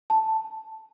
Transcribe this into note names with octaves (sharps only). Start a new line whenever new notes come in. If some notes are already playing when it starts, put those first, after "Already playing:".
A5